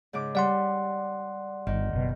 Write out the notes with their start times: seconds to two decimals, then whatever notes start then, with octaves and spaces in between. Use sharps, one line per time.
0.13 G#2 C#3 D6
0.35 G3 D5 F#5 C6
1.67 G1 D#3
1.93 F#1 B2